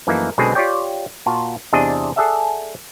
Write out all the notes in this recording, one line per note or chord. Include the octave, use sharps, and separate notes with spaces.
F#2 E3 F3 A3 A#3 D#4
B1 B2 D3 G#3 C4 G#4
F4 G4 C#5 D5 G5
A#2 F4 F#4 A5
E2 C3 D4 G#4 D#5
G#4 A4 D5 E5 F#5